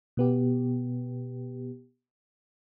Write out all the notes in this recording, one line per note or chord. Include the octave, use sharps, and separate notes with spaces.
B2 B3 G4